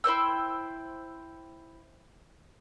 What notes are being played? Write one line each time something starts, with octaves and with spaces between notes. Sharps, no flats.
E4 C5 G5 E6